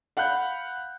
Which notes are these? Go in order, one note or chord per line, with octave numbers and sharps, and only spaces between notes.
F5 F#5 B5 F#6 G6